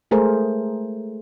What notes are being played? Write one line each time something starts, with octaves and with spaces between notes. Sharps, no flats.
G#3 A3 G#4 A#4 C5